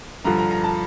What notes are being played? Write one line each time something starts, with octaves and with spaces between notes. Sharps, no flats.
G2 D3 F3 A#5
A#5
A#5
A5